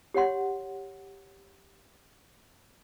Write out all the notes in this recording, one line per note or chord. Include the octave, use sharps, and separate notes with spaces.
G4 C#5 F#5 C6